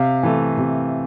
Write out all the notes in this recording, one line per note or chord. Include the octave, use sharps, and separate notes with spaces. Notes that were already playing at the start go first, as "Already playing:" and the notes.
Already playing: C3 F5
E3 A3
C3